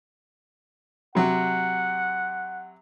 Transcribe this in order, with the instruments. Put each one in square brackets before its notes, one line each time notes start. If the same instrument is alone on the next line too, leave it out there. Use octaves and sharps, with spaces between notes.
[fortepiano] C3 F#3 [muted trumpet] F#5